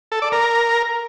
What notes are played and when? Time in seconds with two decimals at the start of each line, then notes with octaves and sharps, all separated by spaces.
0.12 A4
0.22 D5
0.32 A#4